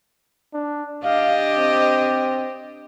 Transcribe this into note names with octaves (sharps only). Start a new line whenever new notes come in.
D4
D4 G4 D#5 F5
C4